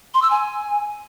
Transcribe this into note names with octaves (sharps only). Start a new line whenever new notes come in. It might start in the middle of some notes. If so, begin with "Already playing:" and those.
C6
E6
G#5